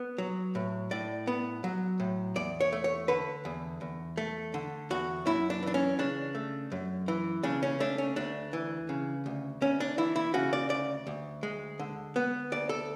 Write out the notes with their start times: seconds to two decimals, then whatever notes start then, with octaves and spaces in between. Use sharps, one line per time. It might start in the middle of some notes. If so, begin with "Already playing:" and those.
Already playing: B3
0.18 F#3
0.55 A2
0.91 A2 D5
1.27 B3
1.64 F#3
2.00 A2
2.36 E2 D5
2.61 C#5
2.72 A3
2.84 C#5
3.08 D3 B4
3.45 E2
3.81 E2
4.17 A3
4.54 D3
4.90 E2 F#4
5.26 F#2 E4
5.50 D4
5.63 E3 D4
5.74 C#4
5.99 C#3 D4
6.35 A3
6.72 F#2
7.08 E3
7.43 C#3 D4
7.63 C#4
7.80 A3 D4
7.98 C#4
8.16 D2 D4
8.53 E3
8.89 C#3
9.26 D2
9.61 D2 C#4
9.80 D4
9.98 E3 E4
10.16 E4
10.34 C#3 F#4
10.53 D5
10.70 D2 D5
11.07 D2
11.43 G#3
11.79 D3
12.16 B3
12.52 D2 D5
12.69 A4